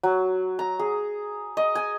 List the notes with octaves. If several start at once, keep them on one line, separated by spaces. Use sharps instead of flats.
F#3
A#5
G#4
D#5
G#5